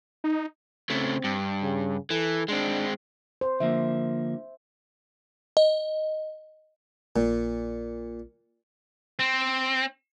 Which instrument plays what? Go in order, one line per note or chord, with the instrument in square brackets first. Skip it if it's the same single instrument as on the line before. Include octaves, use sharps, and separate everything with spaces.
[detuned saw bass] D#4
[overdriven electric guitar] C#3 A3 [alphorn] C4
[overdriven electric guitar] G2
[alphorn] C#3
[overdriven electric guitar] E3 [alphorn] A4
[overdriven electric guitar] G#3 C4 [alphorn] D4
[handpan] C5
[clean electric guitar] D3 F3 A#3 [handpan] E5
[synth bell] D#5
[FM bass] A#1 [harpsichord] A#2
[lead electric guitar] C4